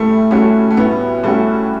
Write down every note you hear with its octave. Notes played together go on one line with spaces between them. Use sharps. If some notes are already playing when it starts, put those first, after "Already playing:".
Already playing: A2 G3 A3 C#4
G3 A3 C#4 F#4
A3
A2 B3
G3 A3 C#4 F#4